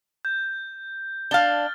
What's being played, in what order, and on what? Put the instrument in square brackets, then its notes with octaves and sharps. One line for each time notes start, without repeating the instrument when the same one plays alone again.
[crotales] G6
[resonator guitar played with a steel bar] D4 F5 [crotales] F6 A6 G7